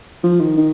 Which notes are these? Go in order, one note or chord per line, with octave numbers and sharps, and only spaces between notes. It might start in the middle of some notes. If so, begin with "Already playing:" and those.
F3
D#3
D#3